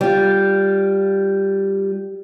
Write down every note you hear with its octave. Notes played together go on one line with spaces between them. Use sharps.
G3 F4